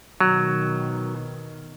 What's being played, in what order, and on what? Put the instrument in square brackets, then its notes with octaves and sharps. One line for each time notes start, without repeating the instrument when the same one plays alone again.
[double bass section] B2 D#3 [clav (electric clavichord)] F#3